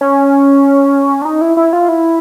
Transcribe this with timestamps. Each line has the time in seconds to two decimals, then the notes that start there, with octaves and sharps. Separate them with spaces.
0.01 C#4
1.22 D4
1.25 D#4
1.41 E4
1.57 E4
1.73 F4
1.89 E4